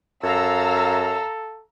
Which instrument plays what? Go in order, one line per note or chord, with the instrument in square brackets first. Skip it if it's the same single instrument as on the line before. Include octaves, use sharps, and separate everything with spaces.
[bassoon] F#2 [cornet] A4 [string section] F5 A#5 E6